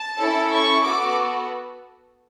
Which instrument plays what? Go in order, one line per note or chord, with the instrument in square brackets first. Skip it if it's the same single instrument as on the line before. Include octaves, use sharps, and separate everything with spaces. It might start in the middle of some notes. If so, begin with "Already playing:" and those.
Already playing: [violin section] A5
C#4 E4 A4
C#6
B3 F#4 A4 D6